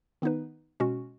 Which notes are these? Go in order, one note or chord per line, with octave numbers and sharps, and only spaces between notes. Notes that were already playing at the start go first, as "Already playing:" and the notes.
D#3 B3 D#4 B4
B2 G#3 C#4 F#4